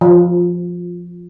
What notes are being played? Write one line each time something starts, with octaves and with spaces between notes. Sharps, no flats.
F3